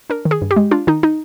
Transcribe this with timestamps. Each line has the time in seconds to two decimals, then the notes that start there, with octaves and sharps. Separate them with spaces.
0.10 D4 A#4
0.25 D#3
0.31 G#4
0.41 G2
0.51 G4
0.56 G#3
0.71 D4 F4
0.87 D#3 D#4
1.03 D#4